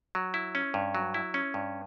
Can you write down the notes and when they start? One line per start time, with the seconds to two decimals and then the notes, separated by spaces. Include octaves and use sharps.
0.15 F#3
0.34 E4
0.55 C#4
0.74 G2
0.95 F#3
1.14 E4
1.34 C#4
1.54 G2